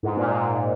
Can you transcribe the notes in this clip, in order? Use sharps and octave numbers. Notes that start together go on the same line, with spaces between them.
G#2
A#2
G#2